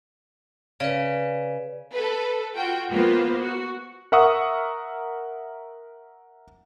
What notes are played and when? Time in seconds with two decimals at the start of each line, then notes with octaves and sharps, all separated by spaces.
0.80 C#3 B4 D5
1.94 A4 B4
2.56 F4 F#4 G5
2.90 A#3 B3 F4 B4 C5
3.42 F#4
4.12 A#4 E5 F#5 C#6 D#6 E6